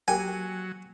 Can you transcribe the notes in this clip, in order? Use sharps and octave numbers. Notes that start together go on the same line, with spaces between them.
F#3 A#3 G4 G5 G#5